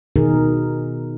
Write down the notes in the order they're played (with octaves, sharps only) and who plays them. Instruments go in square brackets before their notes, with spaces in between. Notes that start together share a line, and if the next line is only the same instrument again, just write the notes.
[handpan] B2 D#3 D#4 G#4 A#4